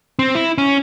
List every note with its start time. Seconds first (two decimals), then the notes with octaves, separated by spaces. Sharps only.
0.19 C4
0.35 E4
0.58 C#4